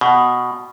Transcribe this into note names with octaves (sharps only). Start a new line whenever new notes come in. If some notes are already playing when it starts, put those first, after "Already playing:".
B2